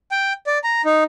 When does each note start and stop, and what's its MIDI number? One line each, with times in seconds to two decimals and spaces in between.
0.11 0.33 79
0.47 0.58 74
0.64 0.82 82
0.85 1.04 63